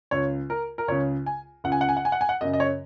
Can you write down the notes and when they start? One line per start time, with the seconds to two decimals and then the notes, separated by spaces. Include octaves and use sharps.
0.11 C#2 C#3 C#5
0.50 A#4
0.78 A#4
0.88 C#2 C#3 C#5
1.26 G#5
1.64 C#2 C#3 F#5
1.72 G#5
1.81 F#5
1.89 G#5
1.97 F#5
2.05 G#5
2.12 F#5
2.21 G#5
2.29 F#5
2.41 F#2 C#3 D#5
2.53 D#5
2.60 C#5